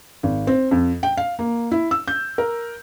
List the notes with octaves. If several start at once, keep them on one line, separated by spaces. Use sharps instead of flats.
G#1
C4
F2
G5
F5
A#3
E4
E6
G6
A#4